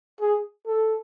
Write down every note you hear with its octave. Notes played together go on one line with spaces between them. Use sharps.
G#4
A4